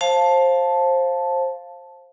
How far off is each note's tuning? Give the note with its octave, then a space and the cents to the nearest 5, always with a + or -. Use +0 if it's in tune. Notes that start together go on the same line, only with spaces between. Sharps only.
C5 +20 F5 +0 A5 -5